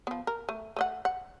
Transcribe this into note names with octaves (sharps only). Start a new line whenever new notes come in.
F3 B3
A#4
A3
A3 D#5 F#5
F#5